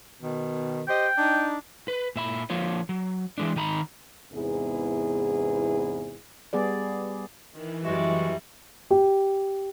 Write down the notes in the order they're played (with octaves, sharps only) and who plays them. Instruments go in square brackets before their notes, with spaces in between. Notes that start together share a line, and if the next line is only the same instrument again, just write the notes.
[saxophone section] B2 D#3
[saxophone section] G4 C5 D#5 [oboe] G5
[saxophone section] D4 D#4
[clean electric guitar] B4
A#2 E5 B5
F3 A#3 F4 C#5
F#3
E3 G#3 D4
D#3 D#4 A#5 B5
[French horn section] E2 G#2 C3 B3 E4 G#4
[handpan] G3 B3 G#4 D5
[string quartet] D#3 [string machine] E3
[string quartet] F#2 G3 [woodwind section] G#3 F#4 [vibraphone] E5
[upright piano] G4